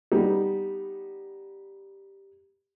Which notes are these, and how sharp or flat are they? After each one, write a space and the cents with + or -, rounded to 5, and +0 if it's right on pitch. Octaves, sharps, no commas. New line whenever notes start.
G3 +0 B3 +0 D#4 +0